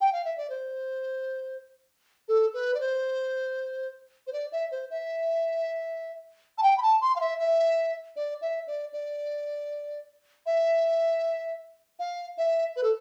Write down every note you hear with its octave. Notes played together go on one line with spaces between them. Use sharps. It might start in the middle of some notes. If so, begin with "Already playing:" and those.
G5
F5
E5
D5
C5
A4
B4
D5
C5
C5
D5
E5
C5
E5
A5
G5
B5
A5
C6
F5
E5
E5
D5
E5
D5
D5
E5
F5
E5
B4
A4